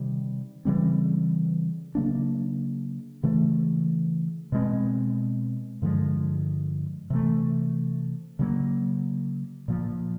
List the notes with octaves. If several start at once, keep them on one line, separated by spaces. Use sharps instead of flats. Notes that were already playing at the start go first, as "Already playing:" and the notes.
Already playing: C3 D#3 G3
C#3 E3 G3 C4
C#3 F#3 A#3 D4
C#3 E3 A3
B2 G#3 C4
G2 D3 F3 G#3
C3 E3 A3
C#3 F#3 A#3
A#2 F3 A#3